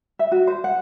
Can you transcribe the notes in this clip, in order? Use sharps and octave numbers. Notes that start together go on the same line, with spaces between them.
E5
F#4
C5
F#5